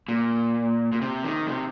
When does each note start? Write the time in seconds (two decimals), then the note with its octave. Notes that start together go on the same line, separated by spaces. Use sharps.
0.08 A#2
0.92 A#2
1.02 C3
1.24 D#3
1.48 C3